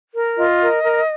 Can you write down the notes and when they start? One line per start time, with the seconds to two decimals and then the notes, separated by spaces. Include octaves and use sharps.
0.14 A#4
0.37 F4 D#5
0.61 A#4
0.83 A#4